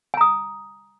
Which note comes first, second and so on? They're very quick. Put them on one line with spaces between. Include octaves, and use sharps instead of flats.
G#5 A#5 D#6